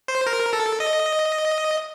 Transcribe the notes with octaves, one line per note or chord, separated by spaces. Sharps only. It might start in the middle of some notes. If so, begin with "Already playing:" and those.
C5
A#4
A4
D#5